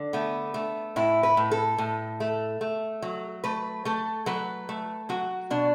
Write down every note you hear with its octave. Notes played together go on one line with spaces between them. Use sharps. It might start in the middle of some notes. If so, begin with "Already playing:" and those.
Already playing: D3
A3 B3
A3
A2 E4
B4
A2
A4
A2
A3
A3
F#3
A3 B4
A3 A4
F#3 B4
A3
F#3 F#4
B2 D4